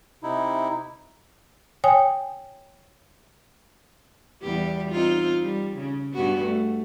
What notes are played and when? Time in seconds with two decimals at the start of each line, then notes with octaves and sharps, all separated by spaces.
0.23 C3 D#4 E4
1.84 C#5 G5 G#5 D#6
4.42 E2 G3 G4
4.92 C4 D#4 F4
5.43 G3
5.78 C#3
6.14 G2 B3 F#4
6.44 A3